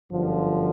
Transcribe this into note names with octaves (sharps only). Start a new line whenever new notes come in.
G1 F#2 D3 F3